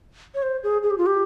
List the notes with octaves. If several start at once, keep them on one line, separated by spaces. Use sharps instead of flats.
C#5
C5
G#4
G#4
G4
F4
G4